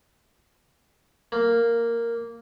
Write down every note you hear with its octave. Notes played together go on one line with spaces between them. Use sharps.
A#3